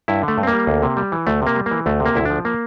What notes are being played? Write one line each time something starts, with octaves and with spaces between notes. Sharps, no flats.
G2 E4
D3 A3
G2
C4
A#3
G3
D2
C3
G3
E3
D2 A3
C3 A#3
G3
A#3
E3
D2 A3
C3
A#3
D2 E4
F3 D4
A#3